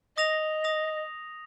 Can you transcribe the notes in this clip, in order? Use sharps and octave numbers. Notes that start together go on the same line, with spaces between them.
D#5 D#6 A#6 F7
D#6 A#6 F7